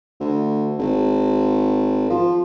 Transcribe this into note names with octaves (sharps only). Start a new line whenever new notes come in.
D2
G#1
F3